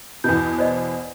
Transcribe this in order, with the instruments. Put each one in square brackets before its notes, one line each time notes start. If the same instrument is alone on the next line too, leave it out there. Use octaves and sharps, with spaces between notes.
[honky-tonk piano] E2 B2 [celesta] G6
[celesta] C5 D5 D#5